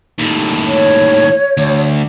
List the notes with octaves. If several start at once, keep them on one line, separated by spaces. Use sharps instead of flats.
D#2 A2
C#5
D2